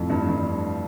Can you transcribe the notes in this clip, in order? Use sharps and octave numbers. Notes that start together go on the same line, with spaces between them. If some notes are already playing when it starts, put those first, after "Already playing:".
Already playing: F2 A2
G2
G2